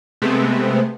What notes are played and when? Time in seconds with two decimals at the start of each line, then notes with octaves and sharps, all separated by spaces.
0.22 C3 G#3 A3 B3 C4